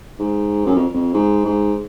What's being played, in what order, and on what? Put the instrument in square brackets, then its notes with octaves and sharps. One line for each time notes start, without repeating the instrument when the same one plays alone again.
[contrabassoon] G#2
F#2
F2
F2
G#2
G#2